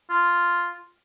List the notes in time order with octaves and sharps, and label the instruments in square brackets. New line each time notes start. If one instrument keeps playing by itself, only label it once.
[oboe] F4